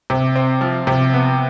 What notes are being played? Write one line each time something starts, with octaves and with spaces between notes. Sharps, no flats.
C3
C4
F3
C3
B3